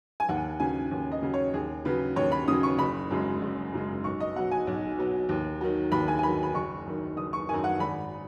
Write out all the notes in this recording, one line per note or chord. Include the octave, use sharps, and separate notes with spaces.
G#5
D#2 F#5
C#3 F#3 G#5
D#2
D#5
C#3 F#3
C#5
D#2 G#4
C#3 F#3 B4
D#2 C#5
B5
C#3 F#3 D#6
C#6
F#1 B5
F#2 C#3 G#3
F#1
F#2 C#3 G#3
B1 C#6
D#5
B2 F#3 F#5
G#5
B1
B2 F#3
D#2
D#3 F#3
D#2 B5
G#5
G#5
D#3 F#3 B5
B5
F#1 C#6
F#2 D#3
F#1 D#6
C#6
F#2 D#3 G#5
F#5
G#1 B5